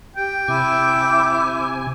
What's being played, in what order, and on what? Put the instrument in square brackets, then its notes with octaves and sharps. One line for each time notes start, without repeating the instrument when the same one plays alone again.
[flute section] G4 [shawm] G5
[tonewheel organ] C3 G#5 [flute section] E4 D6 G6